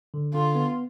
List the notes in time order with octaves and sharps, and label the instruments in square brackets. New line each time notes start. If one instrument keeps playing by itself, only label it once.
[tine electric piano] D3
[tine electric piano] D3 [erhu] F4
[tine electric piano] B3